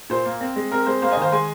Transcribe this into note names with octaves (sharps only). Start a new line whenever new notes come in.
A#2 C5
A#3
C4
G#3
C4 A#4
G#3 C5
A#3 C5 F5
D#5 G#5
D#3
C5 F5
G#3 G#5 C6